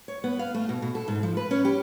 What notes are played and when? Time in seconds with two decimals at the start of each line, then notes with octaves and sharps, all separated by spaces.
0.08 C#5
0.24 B3
0.39 F5
0.54 A3
0.69 B2
0.82 B2
0.95 A4
1.08 G#2
1.23 F3
1.37 B4
1.51 C#4
1.65 G4